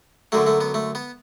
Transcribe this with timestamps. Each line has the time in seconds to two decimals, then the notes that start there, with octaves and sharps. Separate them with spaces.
0.32 F#2 D3 F#3 A3
0.47 A3
0.61 B3
0.74 A3
0.95 B3